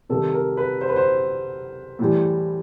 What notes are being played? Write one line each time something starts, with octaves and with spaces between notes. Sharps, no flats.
C3 D#3 G3 A4
A#4
B4
C5
B4
C5
A2 E3 G3